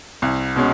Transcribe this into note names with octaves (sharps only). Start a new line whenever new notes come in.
C2
B2 G#3 C#4